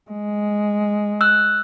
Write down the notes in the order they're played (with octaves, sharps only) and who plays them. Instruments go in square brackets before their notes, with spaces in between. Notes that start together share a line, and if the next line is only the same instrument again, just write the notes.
[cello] G#3
[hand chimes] E6 F#6